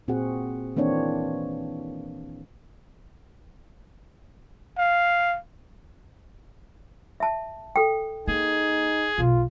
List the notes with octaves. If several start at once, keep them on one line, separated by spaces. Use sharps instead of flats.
A#2 C4 F#4 G#4 F#5
D#3 E3 A#3 C4 D4 C#5
F5
E5 A5
A4 G5
A#3 D#4 G#4
B1 B2 F4